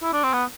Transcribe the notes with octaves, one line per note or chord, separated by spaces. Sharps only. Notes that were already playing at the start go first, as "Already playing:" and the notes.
E4
D4
C4
B3